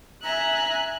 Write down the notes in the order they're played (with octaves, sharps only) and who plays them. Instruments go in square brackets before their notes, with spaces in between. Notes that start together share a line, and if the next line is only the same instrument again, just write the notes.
[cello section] E5 [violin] G#5 [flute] A#5 [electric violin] F#6